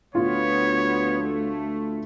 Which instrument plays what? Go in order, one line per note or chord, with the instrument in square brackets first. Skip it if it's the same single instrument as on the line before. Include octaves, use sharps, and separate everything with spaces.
[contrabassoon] D2 [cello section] B3 [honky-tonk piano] F4 [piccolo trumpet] C#5
[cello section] A3